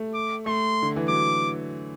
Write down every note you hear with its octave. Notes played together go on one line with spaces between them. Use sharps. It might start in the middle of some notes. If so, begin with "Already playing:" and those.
Already playing: A3
D6
A3 C6
D3
E3
F#3 D6